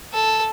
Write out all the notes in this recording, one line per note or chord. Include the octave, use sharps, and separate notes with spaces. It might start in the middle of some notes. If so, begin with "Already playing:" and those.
A4